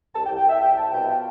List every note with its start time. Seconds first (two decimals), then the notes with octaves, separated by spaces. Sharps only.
0.14 C2 A5
0.26 G5
0.30 C2
0.37 G5
0.45 C2 E5
0.62 C2 G5
0.77 C2 A5
0.92 B2 G5
1.08 F4 G5